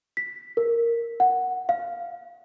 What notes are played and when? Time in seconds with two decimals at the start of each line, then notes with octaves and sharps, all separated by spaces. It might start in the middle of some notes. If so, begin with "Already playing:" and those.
0.17 B6
0.57 A#4
1.20 F#5
1.69 F5